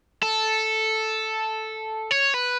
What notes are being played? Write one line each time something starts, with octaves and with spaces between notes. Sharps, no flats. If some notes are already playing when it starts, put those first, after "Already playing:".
A4
C#5
B4